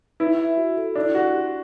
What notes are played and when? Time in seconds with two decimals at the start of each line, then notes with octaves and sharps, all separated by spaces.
0.20 E4 B4
0.39 E5
0.57 F#4
0.77 A4
0.96 D4 E4
1.15 F#4 G4
1.34 G4